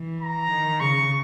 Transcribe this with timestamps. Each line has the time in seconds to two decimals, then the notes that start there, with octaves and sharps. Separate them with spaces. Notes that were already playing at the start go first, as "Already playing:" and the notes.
Already playing: E3
0.21 A#5
0.51 D#3
0.80 C#3 C#6